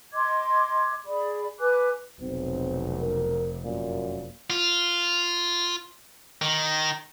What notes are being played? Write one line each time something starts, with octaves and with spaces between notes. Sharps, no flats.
D#5 C6 D6 G#6
G#4 D5 B5
B4 G#5 D6 F#6
F1 B1 C4
A#4
F#2 A#2
F4
D#3